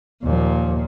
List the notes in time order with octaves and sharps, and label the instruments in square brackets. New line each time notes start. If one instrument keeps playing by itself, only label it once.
[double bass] D#2 F3 [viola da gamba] A#2